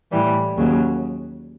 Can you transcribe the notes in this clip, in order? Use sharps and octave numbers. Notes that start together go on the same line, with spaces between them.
A2 E3 G3
D#2 C#3 F#3